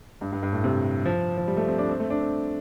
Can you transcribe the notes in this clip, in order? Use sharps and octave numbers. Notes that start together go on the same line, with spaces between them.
G2
G2
G2
A2
C3
F3
F3
G3
A3
C4
D4
C4
A3
D4
C4